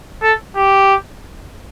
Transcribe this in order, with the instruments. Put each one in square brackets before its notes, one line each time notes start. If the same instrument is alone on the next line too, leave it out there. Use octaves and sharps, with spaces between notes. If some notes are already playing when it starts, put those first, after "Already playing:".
[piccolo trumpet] A4
G4